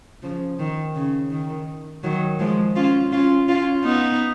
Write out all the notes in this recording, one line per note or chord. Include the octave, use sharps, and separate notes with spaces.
C#3 F3
D#3
C#3
D#3
D#3 F#3
F3 G#3
C#4 F4
C#4 F4
C#4 F4
B3 D#4